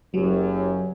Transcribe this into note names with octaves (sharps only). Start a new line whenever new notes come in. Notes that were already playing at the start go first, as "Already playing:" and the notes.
F#1 F#2 F#3 G4 C#5